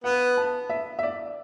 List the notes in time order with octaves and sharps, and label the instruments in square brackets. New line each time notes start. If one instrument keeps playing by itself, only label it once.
[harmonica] B3 [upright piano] F#5
[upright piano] A5
E5
E5
D5